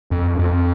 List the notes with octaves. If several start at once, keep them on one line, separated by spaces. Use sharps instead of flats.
F2
F2